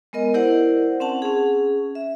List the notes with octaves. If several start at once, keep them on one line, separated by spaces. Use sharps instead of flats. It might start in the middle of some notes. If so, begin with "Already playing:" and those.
G#3 B3 A#4 D#5
E4 G4 A#4 C5 D5 F#5
C4 C#4 F#5 A5
C#4 G#4
E5